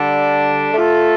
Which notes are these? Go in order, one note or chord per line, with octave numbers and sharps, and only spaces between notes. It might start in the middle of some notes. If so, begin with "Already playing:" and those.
Already playing: D3 G3 D4 A4
A3 F4 A4